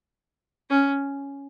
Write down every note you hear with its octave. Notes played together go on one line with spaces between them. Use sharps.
C#4